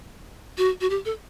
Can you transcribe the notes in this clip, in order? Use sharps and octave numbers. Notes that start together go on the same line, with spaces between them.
F#4
F#4
G4
A4